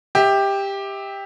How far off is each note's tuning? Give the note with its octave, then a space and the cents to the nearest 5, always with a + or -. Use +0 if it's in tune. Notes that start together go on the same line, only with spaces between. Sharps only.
G4 +10 E5 -30